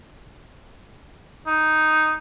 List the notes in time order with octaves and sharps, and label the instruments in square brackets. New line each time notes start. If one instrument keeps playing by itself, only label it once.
[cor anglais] D#4